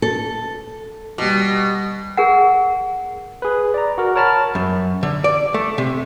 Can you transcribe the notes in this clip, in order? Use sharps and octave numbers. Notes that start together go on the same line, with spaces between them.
A4
B2 G3 D6
G#4 A#4 F#5
G#4 B4
D5 A#5
F#4 A#4
A#4 C#5 A5 B5 F6 A6
F#2
D3
D5
A3
C3